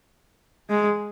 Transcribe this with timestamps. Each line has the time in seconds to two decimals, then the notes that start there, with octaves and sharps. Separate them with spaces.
0.70 G#3